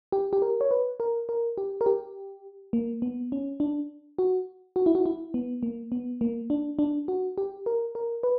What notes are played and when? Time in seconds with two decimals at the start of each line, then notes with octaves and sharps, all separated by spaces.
0.12 G4
0.33 G4
0.42 A#4
0.61 C#5
0.71 B4
1.00 A#4
1.29 A#4
1.58 G4
1.81 A#4
1.86 G4
2.73 A#3
3.02 B3
3.32 C#4
3.60 D4
4.18 F#4
4.76 F#4
4.86 E4
4.95 F#4
5.06 E4
5.34 B3
5.63 A#3
5.92 B3
6.21 A#3
6.50 D4
6.79 D4
7.08 F#4
7.38 G4
7.66 A#4
7.95 A#4
8.23 B4